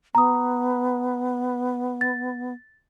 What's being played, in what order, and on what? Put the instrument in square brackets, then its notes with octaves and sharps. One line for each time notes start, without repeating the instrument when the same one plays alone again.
[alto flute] B3 [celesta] A#5 D#6
[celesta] A6